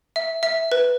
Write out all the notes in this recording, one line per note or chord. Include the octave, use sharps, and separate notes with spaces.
E5
E5
B4